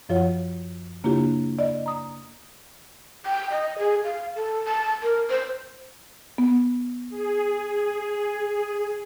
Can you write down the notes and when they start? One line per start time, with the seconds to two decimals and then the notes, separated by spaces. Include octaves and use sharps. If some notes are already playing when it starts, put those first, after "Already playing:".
0.09 F#2 F3 F4 C#5 F#5
1.04 C#3 A#3 D4 E4 F4 G4
1.59 D5 D#5
1.86 A#5 D#6
3.26 G5
3.51 D#5
3.79 G#4
4.04 F5
4.36 A4
4.68 A5
5.03 A#4
5.30 C5
6.38 B3
7.09 G#4